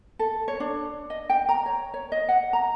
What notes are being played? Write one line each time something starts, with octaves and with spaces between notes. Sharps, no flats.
A4
C#5
D4
D#5
G5
A#5
C#5
C#5
D#5
F#5
A#5